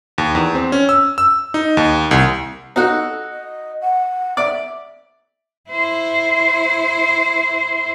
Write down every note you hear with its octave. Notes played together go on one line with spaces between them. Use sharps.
D#2
E2
C4
C#4
E6
E6
D#4
D#2
C2
D#4 F#4 A4
D#5
F#5
D5 E5
E4 C5